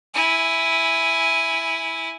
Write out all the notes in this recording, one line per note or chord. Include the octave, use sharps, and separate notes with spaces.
E4 G#5